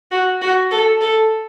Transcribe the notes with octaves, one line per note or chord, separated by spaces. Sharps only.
F#4
F#4
A4
A4